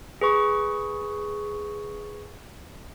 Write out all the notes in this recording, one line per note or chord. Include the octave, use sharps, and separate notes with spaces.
G#4 B4 C#6